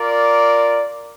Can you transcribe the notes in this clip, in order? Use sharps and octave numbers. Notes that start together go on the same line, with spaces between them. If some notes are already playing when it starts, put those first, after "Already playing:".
Already playing: F4 A#4 D5